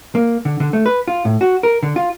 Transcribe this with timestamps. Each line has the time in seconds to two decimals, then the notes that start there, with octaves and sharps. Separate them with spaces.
0.15 A#3
0.45 D3
0.60 D3
0.73 A3
0.86 B4
1.08 F4
1.25 A2
1.41 F#4
1.63 A#4
1.83 D3
1.96 F4